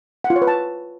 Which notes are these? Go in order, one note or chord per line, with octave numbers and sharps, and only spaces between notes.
F#5
F4
C#5
B4
A5